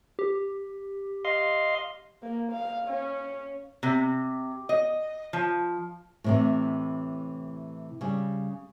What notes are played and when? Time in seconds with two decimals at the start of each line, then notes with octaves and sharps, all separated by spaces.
0.19 G4
1.25 D#5 F5 C6
2.23 A#3
2.51 F5
2.88 C#4
3.83 C3
4.69 D#5
5.33 F3
6.24 A2 C3 E3
8.01 C#3 G3